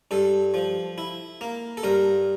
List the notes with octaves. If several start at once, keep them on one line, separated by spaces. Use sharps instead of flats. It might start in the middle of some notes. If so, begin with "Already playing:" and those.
G2 A4
F3
E4
A#3
A4
G2 A#4